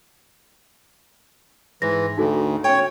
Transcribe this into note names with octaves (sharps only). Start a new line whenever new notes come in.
G#2 E3 A#6
D2 D#4 F#4 A4
C#4 C#5 G5